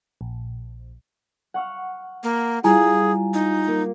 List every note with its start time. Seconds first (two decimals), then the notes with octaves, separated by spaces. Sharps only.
0.21 A#1
1.54 F#5 C#6 F6
2.23 A#3
2.64 G3 E4 F4 G#4 G#5 A#5
3.34 D#4
3.68 A#3